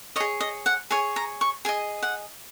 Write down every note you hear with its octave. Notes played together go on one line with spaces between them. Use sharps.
G#4 C#5 D#5
D#5
F#5
G#4 C#5 G#5
A#5
C#6
G#4 D#5 G#5
F#5